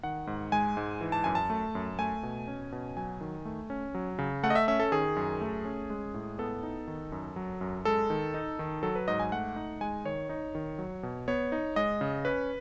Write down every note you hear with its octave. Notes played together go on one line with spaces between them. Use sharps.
D#3 F#5
G#2
G#3 G#5
G#2
E3
A5
F#2 G#5
A5
A3
F#2
A3 G#5
B2
C#4
B2
F#3 G#5
D#3
A3
C#4
F#3
C#3
A3 F#5
D#5
E5
C#4 E5
A4
D#3 G#4
F#2
A3
C#4
G#3
A2
B3 A4
D#4
D#3
F#2
F#3
F#2
G#3 A4
D#3
D#4
D#3
F#3 A4
B4
G#2 D#5
G#5
A3 F#5
D#4
G#3 G#5
D#3 C#5
D#4
D#3
F#3
B2
B3 C#5
D#4
G#3 D#5
C#3
C#4 B4